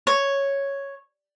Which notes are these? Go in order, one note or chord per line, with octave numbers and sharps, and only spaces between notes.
C#5